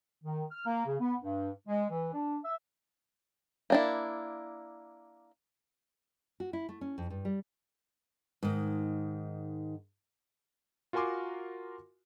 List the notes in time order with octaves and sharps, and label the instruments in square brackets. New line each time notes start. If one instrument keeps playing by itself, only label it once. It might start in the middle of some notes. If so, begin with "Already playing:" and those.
[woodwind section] D#3
F6
A#3
C#3
B3
G2
G#3
E3
D4
E5
[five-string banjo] A#3 D4 E4
[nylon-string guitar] F#4
E4
A3
C#4
F2
G2
G3
G#2 D#3
[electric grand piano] F4 F#4 A#4 G#5 C6 D6